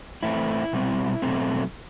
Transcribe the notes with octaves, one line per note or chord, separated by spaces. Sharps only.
A2 E3 A3 C4 E4
B2 G3 C4
B2 F#3 A3 C4